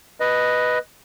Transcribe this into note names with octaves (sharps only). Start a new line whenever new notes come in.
B4 D#5